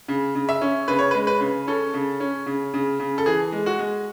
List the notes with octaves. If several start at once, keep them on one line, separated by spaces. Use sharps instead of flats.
C#3
C#3
E5
C#4
C#3 B4
C#5
B4
G#3
B4
C#3
C#4 A4
C#3
C#4
C#3
C#3
C#3
A4
E3 G#4
G#3
F#4
G#3